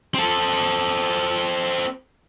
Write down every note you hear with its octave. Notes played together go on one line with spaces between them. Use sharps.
C4 A4